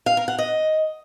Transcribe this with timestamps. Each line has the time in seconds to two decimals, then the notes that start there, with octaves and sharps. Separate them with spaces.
0.06 F5
0.17 A#4
0.28 F#5
0.38 D#5